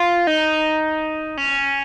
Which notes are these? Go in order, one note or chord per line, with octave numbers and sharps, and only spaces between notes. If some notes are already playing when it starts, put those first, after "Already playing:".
Already playing: F4
D#4
C#4